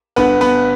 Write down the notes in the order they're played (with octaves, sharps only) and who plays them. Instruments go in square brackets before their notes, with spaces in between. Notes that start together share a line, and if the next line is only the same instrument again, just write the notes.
[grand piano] G1 G2 D3 B3 B4
B3 B4